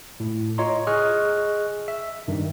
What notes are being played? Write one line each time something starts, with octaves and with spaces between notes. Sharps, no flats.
A2
F4 C#5 D#5 A#5 C6
G#4 D#5 C#6 F6 F#6
E5
G2 D#3